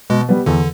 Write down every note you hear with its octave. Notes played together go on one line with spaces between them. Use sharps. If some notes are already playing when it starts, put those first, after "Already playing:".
B2 G#3
G3 B3
E2 D3